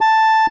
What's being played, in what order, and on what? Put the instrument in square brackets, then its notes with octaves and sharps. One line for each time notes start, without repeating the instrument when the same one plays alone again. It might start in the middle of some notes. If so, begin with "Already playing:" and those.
[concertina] A5